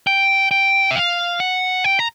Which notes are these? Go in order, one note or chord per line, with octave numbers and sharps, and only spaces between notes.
G5
G5
E5
F5
F#5
G5
A#5